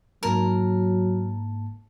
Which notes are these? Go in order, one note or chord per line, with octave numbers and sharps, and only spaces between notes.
G#2 F#3 A#3 A#4 A5